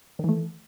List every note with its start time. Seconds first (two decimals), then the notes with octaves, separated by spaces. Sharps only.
0.19 D#3
0.24 E3
0.29 A3